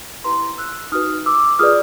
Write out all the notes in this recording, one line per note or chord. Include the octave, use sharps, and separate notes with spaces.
E4 G4 B4 A#5 C6
E6 F#6
D#4 F#4 B4 D#6 F6
D6 E6
F4 G#4 B4 D5 D#6 F6